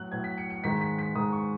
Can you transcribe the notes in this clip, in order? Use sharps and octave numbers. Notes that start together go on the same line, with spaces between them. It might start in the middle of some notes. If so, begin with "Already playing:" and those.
Already playing: A2 F#3 F#6
A2 F#3 G#6
B6
C#7
C#7
G#2 D#3 G#3 B6
B6
B6
G#2 D#3 G#3 D#6
C#6